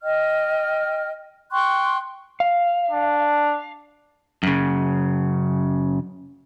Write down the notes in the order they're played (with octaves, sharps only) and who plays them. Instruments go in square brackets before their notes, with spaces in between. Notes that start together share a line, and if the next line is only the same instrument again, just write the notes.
[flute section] D#5 G5 F6
G5 C6 C#6 F#6
[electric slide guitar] F5
[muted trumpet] D4
[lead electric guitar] F#2 C#3